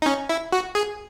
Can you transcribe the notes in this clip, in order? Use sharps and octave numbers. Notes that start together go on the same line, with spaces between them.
D#4
C#4
E4
F#4
G#4